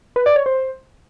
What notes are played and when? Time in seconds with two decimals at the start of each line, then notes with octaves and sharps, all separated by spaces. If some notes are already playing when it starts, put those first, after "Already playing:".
0.16 B4
0.26 D5
0.36 C#5
0.46 C5